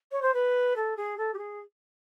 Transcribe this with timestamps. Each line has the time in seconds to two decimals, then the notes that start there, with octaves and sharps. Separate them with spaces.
0.12 C#5
0.22 C5
0.34 B4
0.76 A4
0.97 G#4
1.17 A4
1.34 G4
1.38 G#4